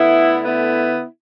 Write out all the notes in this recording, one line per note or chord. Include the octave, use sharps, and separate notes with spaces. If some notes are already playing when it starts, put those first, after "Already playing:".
Already playing: D3 A3 B3 E4
B3 E4